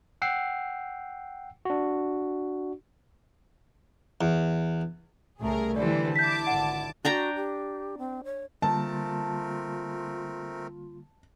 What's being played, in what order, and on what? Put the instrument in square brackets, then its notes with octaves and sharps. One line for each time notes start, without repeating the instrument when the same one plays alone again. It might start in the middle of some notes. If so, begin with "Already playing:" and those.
[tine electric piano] F#5 G5 E6 C7
D4 F#4
[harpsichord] E2
[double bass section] C2 C#3 A3 [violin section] G#4 A#4
[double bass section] D3 [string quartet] E3 G3 A4 [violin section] B4 C5 [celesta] D5
[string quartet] E4 [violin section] A5 D6 [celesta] G6 B6
[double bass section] G#1 D3 [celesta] F#5
[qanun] D4 G5 A#5 [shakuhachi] F#4
[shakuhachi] G4
C4
C#5
[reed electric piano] D3 G3 A#3 [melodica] A3 C4 A#4 [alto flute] F4 [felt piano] A5